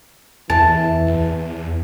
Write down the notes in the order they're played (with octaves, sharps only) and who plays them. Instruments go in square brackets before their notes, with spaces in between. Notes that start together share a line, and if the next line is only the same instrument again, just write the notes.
[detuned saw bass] E2 [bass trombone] E3 [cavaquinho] A5
[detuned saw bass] E2